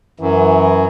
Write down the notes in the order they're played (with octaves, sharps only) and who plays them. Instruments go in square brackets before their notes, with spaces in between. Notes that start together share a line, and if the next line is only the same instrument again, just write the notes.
[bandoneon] F#2 [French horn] E3